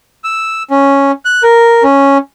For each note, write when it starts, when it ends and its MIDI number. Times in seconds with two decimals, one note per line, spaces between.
0.24 0.63 88
0.71 1.12 61
1.25 1.43 90
1.43 1.83 70
1.83 2.18 61